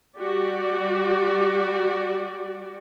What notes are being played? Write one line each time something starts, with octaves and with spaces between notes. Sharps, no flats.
G3 F#4 G4 D5